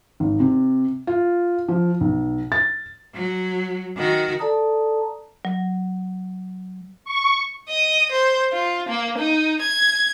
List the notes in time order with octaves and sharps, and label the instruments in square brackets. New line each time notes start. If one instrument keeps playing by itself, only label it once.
[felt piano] G#1
C3
F4
F3
B1
A6
[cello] F#3
D#3 F#4
[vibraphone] A4 D5 A5 A#5 D#6
[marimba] F#3
[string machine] C#6
[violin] D#5
C5
F4
A#3
D#4
G#6